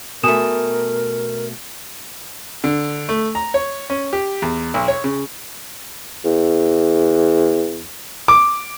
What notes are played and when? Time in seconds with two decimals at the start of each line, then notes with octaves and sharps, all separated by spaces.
0.23 B2 A3 A#4 G#5 D#6 E7
2.64 D3
3.09 A3
3.35 A#5
3.54 C#5
3.90 C#4
4.13 G4
4.42 E2
4.74 B1
4.88 C#5
5.04 C#3
6.25 E2
8.28 D6